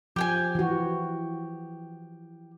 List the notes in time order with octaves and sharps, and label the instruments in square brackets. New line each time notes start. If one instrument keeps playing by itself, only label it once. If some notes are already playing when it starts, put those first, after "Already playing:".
[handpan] F3 [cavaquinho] G4 G5 G#5
[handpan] E3 F#4